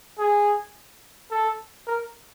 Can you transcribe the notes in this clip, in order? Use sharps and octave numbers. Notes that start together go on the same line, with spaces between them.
G#4
A4
A#4